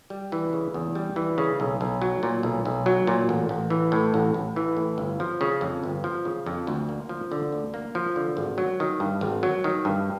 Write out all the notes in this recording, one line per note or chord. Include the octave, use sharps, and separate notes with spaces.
G3
E3
C#3
E2
G3
E3
C#3
B1
B1
F#3
A#2
B1
B1
F#3
A#2
A1
A1
E3
A2
A1
A1
E3
A2
G1
F3
C#3
F2
G1
F3
C#3
F2
D2
A#3
F3
D3
D2
A#3
F3
D3
G#1
F#3
D#3
G2
G#1
F#3
D#3
G2